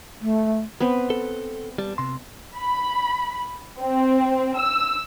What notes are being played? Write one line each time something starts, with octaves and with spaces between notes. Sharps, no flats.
A3
B3 C4 B4
A4
G3 A5
C3 C6
B5
C4
E6